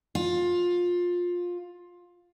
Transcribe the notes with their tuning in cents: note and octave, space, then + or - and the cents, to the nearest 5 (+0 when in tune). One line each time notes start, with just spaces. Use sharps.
F4 +15